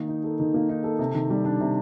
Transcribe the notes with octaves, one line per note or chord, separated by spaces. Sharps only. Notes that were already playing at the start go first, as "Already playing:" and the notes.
Already playing: D#3 A#3
D#4
A4
D#3
A#3
D#4
A4
C3
D#3
G3
D4
C3